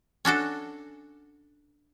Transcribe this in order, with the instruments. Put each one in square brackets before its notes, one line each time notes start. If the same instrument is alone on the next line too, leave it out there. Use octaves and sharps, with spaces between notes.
[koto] C#4 D4 F#4 A4